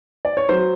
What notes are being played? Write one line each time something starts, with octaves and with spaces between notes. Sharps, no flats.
D5
C#5
F#3 C5